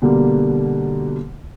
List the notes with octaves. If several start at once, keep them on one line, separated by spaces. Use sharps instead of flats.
B2 D3 G3 A#3